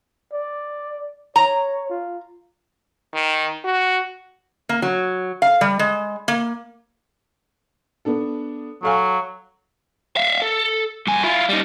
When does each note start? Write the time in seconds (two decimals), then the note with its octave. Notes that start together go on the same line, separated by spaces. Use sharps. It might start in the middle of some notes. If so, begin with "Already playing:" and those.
0.32 D5
1.36 C#5 A#5
1.89 F4
3.14 D#3
3.65 F#4
4.69 A#3
4.82 F#3
5.42 F5
5.61 G3
5.79 G#3
6.28 A#3
8.05 B3 D4 A4
8.83 F#3 A4 F5 G#5
10.16 E5 F5
10.42 A4
11.07 G2 G#5
11.23 E4 F4
11.49 G3 D#4